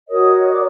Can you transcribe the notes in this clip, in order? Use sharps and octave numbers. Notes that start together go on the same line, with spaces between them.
F#4 A#4 C#5 D#5 D#6
D#5 D#6
D5 D6